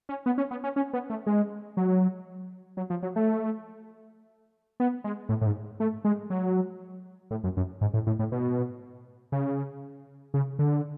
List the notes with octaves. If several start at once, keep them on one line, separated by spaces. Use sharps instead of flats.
C#4
B3
C#4
B3
C#4
C#4
B3
A3
G#3
F#3
F#3
F3
F#3
A3
B3
G#3
A2
A2
G#2
A3
G#3
F#3
A2
F#2
F#2
G#2
A2
A2
A2
B2
C#3
C#3
D3